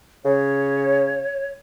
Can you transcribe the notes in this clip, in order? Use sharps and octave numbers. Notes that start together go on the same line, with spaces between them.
C#3 C#5